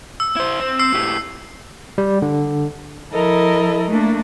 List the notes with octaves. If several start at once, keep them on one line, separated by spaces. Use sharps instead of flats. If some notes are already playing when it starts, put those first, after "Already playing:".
E6
E4 C5
C4
E6 C7
A2 G3
G3
D3
F3 E4 A4 A#4 D#5
A3 A#3 D4